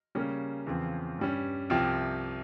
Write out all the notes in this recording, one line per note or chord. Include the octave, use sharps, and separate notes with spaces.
C#3 G3 A#3 C#4
E2 C#3 F3 C4 F4
G2 G3 C#4
C2 C3 F3 C4 G4